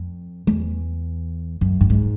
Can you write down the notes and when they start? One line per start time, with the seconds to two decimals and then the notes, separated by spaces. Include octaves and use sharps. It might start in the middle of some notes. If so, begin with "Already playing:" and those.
Already playing: F2
0.47 E2
1.61 F#2
1.81 G2
1.90 G#2